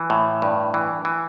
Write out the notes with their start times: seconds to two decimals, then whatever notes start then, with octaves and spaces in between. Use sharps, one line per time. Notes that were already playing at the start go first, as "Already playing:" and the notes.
Already playing: E3
0.10 A2
0.42 G2
0.74 E3
1.05 E3